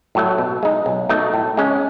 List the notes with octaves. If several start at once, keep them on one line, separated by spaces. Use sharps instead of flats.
A2 F#3 A3
B2
G#3 D#4
B1
B2 A3 D#4
A2
G#3 C#4